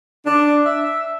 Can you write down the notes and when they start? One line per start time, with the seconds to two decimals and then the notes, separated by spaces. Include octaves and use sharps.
0.26 D4
0.66 E5